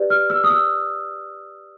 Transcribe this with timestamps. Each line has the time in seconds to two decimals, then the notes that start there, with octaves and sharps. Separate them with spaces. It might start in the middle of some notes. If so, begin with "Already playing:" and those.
Already playing: G4 B4 D5
0.10 F6
0.30 E6
0.44 D#6
0.50 E6